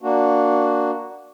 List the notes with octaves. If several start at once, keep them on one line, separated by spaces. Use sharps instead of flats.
A#3 D4 F#4